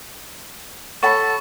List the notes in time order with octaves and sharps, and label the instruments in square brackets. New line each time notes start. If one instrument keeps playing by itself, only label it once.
[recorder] A4 [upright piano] C#5 F#5 B5 [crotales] C#6 [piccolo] A6